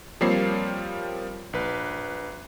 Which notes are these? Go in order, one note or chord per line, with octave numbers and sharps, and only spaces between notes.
F3 G3 A#3 C4 C#5 C7
A#1 B4